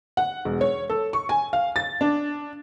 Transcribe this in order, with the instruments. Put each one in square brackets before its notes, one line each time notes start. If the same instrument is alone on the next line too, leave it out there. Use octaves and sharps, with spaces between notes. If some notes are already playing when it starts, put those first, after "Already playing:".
[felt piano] F#5
E1
C#5
A4
C#6
G#5
F5
A6
D4